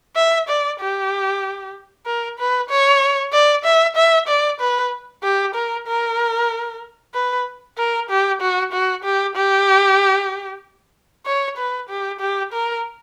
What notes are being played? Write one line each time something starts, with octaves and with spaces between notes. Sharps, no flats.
E5
D5
G4
A#4
B4
C#5
D5
E5
E5
D5
B4
G4
A#4
A#4
B4
A#4
G4
F#4
F#4
G4
G4
C#5
B4
G4
G4
A#4